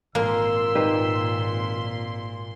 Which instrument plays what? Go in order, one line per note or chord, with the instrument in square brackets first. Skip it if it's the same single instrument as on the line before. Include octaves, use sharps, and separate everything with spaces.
[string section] G#1 A#2 C6 [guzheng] A#3 [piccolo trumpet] E6
[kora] D#4 G4 B4